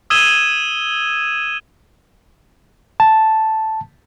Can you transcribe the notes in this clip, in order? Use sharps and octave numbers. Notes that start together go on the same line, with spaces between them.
D#6 E6 G#6 D#7 E7 G7
A5